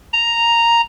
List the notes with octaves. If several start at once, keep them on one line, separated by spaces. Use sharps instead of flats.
A#5